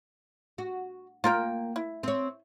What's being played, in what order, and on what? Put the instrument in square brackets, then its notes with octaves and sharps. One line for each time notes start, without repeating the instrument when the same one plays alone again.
[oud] F#4
[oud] A#3 [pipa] F4 A#4 G5
[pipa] E4
[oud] C4 C#5